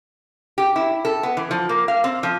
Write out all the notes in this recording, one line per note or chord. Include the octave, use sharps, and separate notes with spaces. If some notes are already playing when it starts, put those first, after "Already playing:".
G4
E4
A4
B3
E3
F3
A#3
F5
C4
F3